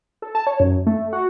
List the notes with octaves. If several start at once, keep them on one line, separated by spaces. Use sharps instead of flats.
A4
A5
C#5
F#2
A3
F#4